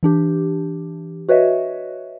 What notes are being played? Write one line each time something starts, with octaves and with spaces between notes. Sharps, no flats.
E3 D4 G4
F#4 B4 C#5 D#5 E5